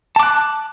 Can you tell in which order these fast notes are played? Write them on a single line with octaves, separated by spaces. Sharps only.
A5 D6 F#6